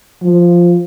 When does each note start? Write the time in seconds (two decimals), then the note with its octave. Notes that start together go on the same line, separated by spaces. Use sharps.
0.22 F3